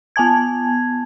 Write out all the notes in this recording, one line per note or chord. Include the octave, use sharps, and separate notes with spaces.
B3 G#5 A5 G#6